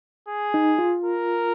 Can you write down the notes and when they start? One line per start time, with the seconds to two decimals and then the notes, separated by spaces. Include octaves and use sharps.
0.28 G#4
0.54 D#4
0.79 F4
1.04 A#4